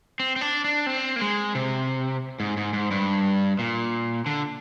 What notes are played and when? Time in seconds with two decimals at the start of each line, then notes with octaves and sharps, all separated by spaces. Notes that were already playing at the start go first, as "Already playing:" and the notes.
0.20 C4
0.36 C4
0.41 D4
0.64 D4
0.87 C4
1.16 A#3
1.21 G#3
1.55 C3
2.40 G#2
2.57 G#2
2.73 G#2
2.91 G2
3.59 A#2
4.26 D3